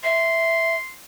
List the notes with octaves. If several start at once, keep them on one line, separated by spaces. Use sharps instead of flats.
E5 C6